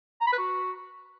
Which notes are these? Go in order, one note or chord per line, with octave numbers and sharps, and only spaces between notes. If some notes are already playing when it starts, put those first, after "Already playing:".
A#5
B5
B4
F#4